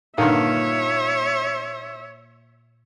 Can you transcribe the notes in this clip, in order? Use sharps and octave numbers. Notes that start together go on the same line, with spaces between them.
G2 A#2 D3 D#3 C#5 E5 F5